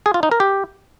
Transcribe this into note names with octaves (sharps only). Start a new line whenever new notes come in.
G#4
F4
D#4
A#4
G4